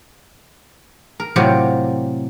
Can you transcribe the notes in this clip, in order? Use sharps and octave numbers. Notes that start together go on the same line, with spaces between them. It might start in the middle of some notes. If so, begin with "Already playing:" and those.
A#4
A2 C3 F#3 F4 G4